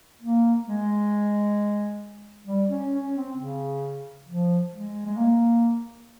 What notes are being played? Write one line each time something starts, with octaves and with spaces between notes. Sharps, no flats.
A#3
G#3
G3
C#4
C#4
C4
C#3
F3
G#3
G#3
A#3